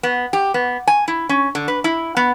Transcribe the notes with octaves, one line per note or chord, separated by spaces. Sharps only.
B3
G4
B3
G#5
E4
C#4
D3
B4
E4
B3